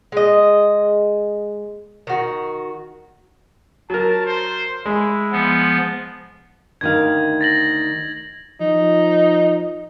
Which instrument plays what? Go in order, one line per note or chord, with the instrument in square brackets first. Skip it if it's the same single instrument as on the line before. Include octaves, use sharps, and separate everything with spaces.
[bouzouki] G#3 D#5
D#3 F#4
[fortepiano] F#3 A#4 [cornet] A5
[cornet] C5
[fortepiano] G#3 [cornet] E4
[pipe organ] F3 B3
[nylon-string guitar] D2 D#3 F5 [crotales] G#6
[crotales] A6 A#6 F#7
[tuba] F3 [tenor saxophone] D#4